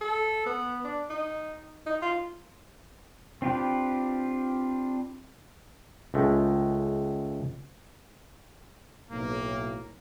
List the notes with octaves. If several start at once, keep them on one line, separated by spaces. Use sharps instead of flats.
A4
B3
D4
D#4
D#4
F4
C4 D4 F4 G4 B4
C#2 G#3 A3
B1 A2 A#3